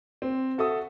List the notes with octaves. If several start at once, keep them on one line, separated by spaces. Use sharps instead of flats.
C4
F#4 A4 E5 D#6